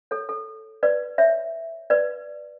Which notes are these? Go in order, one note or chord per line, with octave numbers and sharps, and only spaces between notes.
A4 C#5
A4
B4 D5
C#5 E5
B4 D5